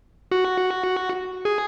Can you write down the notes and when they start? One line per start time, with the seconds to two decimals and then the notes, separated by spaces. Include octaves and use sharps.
0.31 F#4
1.45 G#4